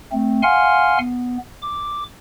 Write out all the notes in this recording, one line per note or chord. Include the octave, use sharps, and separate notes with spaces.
A3 C4
F5 F#5 G#5 C6 F6
B3
D6